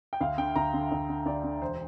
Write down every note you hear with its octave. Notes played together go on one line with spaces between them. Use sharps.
G5
D2 F5
D3 G5
D2 A#5
D3
D2
D3
D2 D5
D3
E1 C5